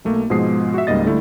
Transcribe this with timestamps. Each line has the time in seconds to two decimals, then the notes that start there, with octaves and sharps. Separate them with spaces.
0.05 B1 A3 A#3
0.30 G#2 B2 F3 G#3 D#6 C7
0.74 F#4 E5
0.87 C#2 G#2 G3 A#3 D#5 A6
1.06 D3 G3 A3 E4